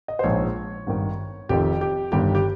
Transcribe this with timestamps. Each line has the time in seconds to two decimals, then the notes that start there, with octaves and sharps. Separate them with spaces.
0.08 D#5
0.19 C5
0.23 A#1 G#2 F3 C#5
0.86 G#1 G2 D#3
1.49 F1 F2 D#3 G4
1.81 G4
2.12 G1 G2 D#3 G4
2.35 G4